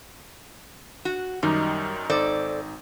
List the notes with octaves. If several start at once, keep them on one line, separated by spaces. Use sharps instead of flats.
F#4
F#2 D#3 G3 D#4
G#1 D#4 A4 C5 D5